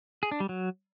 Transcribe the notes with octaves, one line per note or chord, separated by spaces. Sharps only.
G#4
D4
G3
F#3